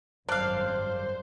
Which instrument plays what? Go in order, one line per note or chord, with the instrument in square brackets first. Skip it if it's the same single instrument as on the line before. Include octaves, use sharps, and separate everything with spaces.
[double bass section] G#1 F#2 G3 [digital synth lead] C5 [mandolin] D5 F5 [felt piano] A5 F#6